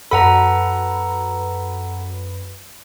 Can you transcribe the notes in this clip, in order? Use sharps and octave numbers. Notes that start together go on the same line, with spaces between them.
F#2 A4 B4 F#5 A#5 B5